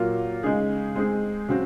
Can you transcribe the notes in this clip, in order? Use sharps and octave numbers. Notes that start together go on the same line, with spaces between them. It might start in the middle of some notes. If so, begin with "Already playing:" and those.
Already playing: A#2 F#3 A#3 F4
C#3 G#3 D#4 G#4
G#3 C4 D#4 G#4
C#3 F#3 C4 F#4